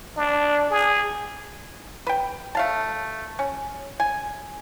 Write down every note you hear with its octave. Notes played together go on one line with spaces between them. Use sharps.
D4
G#4
B4 G5
A3 F5 A5
C#4
G#5